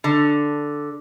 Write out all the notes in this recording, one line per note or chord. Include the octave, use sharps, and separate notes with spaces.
D3